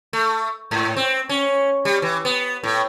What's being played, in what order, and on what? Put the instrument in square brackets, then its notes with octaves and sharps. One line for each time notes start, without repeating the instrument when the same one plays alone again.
[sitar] A3
G#2
C4
C#4
G3
E3
B3
A2